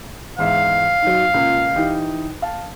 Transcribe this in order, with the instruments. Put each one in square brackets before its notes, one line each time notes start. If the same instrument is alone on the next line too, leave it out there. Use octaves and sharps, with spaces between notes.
[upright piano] E2 G#2 E5 [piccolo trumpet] F5
[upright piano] F#3 D#4
C#2 A#2
E3 D#4 G4
F5 A5